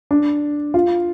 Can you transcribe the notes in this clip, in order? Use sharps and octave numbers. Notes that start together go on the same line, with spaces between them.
D4
F4